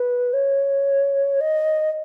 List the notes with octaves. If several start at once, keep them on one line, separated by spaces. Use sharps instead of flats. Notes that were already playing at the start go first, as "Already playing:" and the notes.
Already playing: B4
C#5
D#5